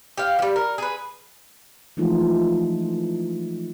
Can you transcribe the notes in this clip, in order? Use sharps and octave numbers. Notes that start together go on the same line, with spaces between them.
G4 F5
F3 G3
A#4
G#4 B4
E3 F3 G#3 A3 D#4 F4